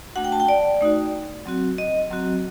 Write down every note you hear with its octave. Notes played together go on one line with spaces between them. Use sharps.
A3 D4 F#4 F#5
G5
A5
G5
D5
A3 D#4 F#4
F#3 C4 F#4
D#5
F#3 C4 F#4